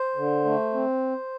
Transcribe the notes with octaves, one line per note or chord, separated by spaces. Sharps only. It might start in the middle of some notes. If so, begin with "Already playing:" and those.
Already playing: C5
D3
A3
C4